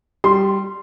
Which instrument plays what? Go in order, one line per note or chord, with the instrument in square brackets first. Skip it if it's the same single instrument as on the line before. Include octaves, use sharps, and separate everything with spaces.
[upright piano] G3 C6